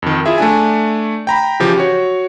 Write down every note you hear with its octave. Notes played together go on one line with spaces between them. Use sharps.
F2 D#3
E4 F4 G#4 E5
A3 D4 G#5
G5 A#5 B5
C#3 E3 F3 G4
F#4 C#5